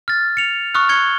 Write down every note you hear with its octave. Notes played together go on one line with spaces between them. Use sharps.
F6 A6
C#7 F7
C#6 D#6 F6 F#6
G#6 C#7 G7